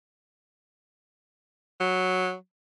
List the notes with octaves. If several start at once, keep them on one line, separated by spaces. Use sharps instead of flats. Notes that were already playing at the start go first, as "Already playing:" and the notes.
F#3